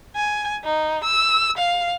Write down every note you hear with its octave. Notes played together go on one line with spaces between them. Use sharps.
G#5
D#4
E6
F5